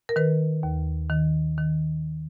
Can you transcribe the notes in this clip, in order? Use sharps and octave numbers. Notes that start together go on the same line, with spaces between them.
A#4
D#3 B4
D#2
D#3
D#3